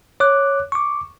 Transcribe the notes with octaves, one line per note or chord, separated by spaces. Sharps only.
C#5 D6 F#6
C#6 D6